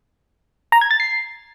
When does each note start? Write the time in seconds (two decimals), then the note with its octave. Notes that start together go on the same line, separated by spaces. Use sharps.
0.72 A#5
0.81 G#6
0.91 A6
1.00 C7